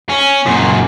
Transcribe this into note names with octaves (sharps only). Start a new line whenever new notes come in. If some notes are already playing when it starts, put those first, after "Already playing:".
C#4
F#2 A#2